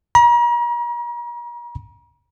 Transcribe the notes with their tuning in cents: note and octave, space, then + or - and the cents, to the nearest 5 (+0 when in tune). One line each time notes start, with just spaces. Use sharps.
A#5 +40